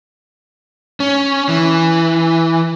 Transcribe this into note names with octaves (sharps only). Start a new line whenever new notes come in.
C#4
E3